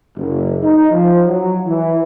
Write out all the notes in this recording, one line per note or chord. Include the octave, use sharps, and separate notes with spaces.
F#1
D#4
F3
F#3
E3